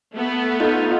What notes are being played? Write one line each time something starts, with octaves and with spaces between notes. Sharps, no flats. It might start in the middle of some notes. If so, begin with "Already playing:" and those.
A3 B3
D#4 F4